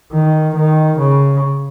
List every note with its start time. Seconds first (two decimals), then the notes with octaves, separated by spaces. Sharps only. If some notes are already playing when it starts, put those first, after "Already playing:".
0.12 D#3
0.56 D#3
0.98 C#3